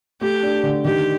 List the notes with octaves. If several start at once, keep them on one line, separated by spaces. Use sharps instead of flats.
A3 G4
D4
D3
D#3 G4